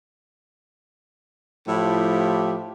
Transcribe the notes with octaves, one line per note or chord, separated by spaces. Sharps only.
A2 F3 E4 G4